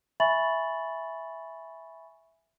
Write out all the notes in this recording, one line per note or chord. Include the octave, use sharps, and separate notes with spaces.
E5 G#5 B5 C#6 A6 F#7